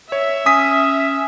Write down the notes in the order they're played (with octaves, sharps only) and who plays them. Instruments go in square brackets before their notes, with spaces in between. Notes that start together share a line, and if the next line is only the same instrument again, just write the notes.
[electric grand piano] C#5 [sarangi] E5
[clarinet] C#4 [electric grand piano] D#6 B6